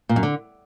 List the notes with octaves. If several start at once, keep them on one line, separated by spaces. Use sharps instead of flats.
A#2
F#2
D3